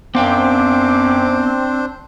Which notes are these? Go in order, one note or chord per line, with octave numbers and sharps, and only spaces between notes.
F#2 B3 C4 D4 C5 F5 G5 D6